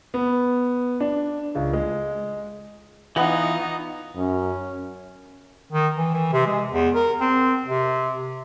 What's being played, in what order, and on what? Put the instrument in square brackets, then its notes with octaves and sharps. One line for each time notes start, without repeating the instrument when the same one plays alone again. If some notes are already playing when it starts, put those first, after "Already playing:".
[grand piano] B3
D4
C#2
G#3
[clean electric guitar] E3 [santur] B3 D#5 F#5 [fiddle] D#4 [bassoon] F4
[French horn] F#2 [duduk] C#4
[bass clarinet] D#3
E3
E3
C3
G#3
E2
A#4
C4
C3